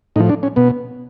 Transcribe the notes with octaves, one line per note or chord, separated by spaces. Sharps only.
A2 F3 D#4
D4
C#4
B2 B3